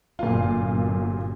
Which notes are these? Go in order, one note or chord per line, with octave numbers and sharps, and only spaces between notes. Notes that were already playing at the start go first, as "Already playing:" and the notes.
G1 F#2 A#2 F4